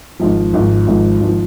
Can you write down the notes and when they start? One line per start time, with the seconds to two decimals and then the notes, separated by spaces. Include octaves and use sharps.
0.20 G#1 G#2 F3
0.53 G#1 G#2 F3
0.87 G#1 G#2 F3
1.20 G#1 F3